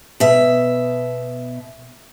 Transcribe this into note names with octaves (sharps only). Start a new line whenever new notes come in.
B2 E5